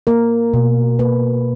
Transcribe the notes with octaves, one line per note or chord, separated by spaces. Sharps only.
A#3 A#4
B2
A#3 B4